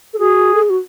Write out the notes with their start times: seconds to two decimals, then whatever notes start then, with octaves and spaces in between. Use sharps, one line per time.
0.14 A4
0.19 F#4 G#4
0.54 A4
0.62 G#4
0.70 F#4